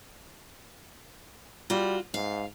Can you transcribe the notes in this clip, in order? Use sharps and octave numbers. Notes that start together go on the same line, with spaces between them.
G3 F4 F#4
G#2 F5